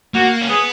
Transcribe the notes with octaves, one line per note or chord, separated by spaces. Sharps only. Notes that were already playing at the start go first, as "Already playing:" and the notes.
A#3 F#4
C#4
B3 G#4